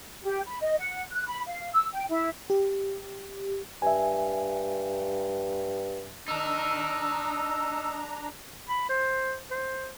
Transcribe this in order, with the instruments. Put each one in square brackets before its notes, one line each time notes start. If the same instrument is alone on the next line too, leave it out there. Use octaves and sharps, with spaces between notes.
[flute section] G4
B5
D#5
F#5
F#6
B5
F5
E6
G5
E4
[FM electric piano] G4
[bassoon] G2 [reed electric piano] E5 G#5
[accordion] D4 A#5 [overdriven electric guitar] D#4 A#4 [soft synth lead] E6
[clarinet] B5
C5
C5